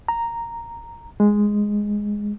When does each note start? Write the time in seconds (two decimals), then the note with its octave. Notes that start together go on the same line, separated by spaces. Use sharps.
0.08 A#5
1.20 G#3